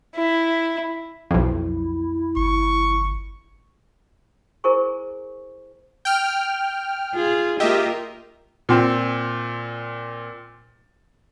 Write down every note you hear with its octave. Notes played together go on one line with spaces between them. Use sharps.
E4
B1 F2 E4
G1 C#6
E4 G#4 A#4 C5 G#5 C#6
G5 F6
F4 G#4
A#3 F4 G4 A#4 D#5 E5
A#2 C4